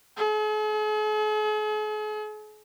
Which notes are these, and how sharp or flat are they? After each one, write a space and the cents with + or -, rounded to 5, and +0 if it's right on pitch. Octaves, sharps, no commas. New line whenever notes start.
G#4 +45